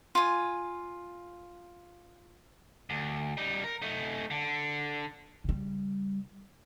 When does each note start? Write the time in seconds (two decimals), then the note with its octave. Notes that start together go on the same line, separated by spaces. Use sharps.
0.15 F4 G#5
2.90 D2
3.37 G3 D#4
3.64 A#4
3.82 A3 D#4
4.31 D3
5.44 C#3 G3